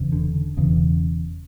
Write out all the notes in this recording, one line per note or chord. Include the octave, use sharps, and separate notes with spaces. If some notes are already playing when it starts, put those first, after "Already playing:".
Already playing: E1 E2 C#3
D3
E1 E2 C#3